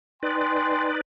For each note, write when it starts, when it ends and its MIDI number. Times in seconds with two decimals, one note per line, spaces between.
0.23 1.01 63
0.23 1.01 71
0.23 1.01 74
0.23 0.90 79
0.23 0.90 80
0.23 0.90 84